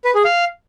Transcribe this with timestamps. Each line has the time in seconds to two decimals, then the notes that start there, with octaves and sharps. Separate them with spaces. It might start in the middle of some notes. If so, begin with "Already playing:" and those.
0.05 B4
0.15 G#4
0.25 F5